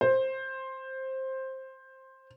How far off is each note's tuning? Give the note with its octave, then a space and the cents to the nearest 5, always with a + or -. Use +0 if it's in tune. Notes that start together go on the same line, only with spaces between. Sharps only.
C5 +10